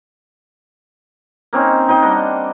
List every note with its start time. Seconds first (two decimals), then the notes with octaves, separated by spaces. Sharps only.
1.53 A#3 C4 C#4 D#4
1.88 D#4 C5 D#5 G5
2.02 G3 D4 D#5 F#5